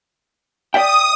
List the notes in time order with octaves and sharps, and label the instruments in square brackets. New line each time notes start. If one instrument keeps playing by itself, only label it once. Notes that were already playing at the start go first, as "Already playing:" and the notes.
[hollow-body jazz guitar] D5 E5 G5 [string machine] D#6